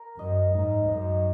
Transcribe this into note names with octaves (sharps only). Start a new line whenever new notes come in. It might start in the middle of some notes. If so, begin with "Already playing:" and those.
Already playing: A#4
F#2 D#5
G#2 D#4
F#2 D#5